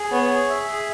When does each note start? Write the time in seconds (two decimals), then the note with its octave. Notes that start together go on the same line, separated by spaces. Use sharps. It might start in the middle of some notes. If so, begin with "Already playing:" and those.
Already playing: G#4
0.12 B3 C#5
0.30 G#4
0.49 E5
0.68 G#4